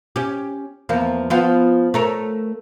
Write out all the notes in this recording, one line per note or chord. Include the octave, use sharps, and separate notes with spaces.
C#4 G4
E2 F3 A#3
F3 B3 F4
A3 A#4 C#5